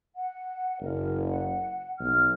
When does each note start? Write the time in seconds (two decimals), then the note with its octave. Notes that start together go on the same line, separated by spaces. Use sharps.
0.16 F#5
0.80 F#1 A#4
1.28 F#5
2.00 B1 F6